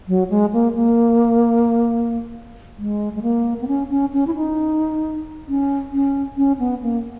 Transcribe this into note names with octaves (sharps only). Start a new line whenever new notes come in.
F#3
G#3
A#3
A#3
G#3
G#3
A#3
B3
C#4
C#4
C#4
E4
D#4
C#4
C#4
C#4
B3
A#3